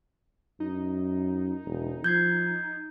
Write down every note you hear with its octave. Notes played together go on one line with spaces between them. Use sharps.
F#2 D#4
E1
F3 G6 G#6 C7